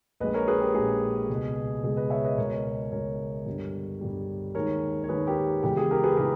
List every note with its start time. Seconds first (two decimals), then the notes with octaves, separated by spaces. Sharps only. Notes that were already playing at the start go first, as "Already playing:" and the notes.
0.20 A#1 A#2 G#3 B4 D#5
0.34 A#4 C#5
0.48 G#4 B4
0.61 G4 A#4
0.74 A#1 A#2 G#3 G#4
1.29 C#2 B2 G#3
1.84 C#2 B2 G#3 G#4
1.97 B4 D#5
2.10 C#5 E5
2.24 B4 D#5
2.38 C#2 B2 G#3 A#4 C#5
2.92 C#2 B2 G#3 A#4 C#5
3.46 G1 G2 G3
4.01 G1 G2 G3
4.55 D#2 D#3 G#3 A#4 C#5
5.04 C#5
5.09 D#2 D#3 G#3 G#4 B4
5.27 G4 A#4
5.63 E2 C#3 E3 G#3 G4
5.77 G#4
5.91 G4 A#4
6.04 G#4 B4
6.17 C#3 E3 G4 A#4